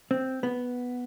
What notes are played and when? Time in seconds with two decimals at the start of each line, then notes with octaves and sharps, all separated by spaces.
0.11 C4
0.43 B3